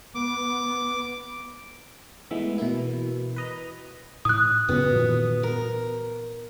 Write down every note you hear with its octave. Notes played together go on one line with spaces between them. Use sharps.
B3 D6
E3 G#3 A3 B3 E5
B2 E3 A#3 E4
B4 D#5 A#5
A2 D#6 F#6
F#2 C#3 B3 F#4
A#2 D#3 E3
A#4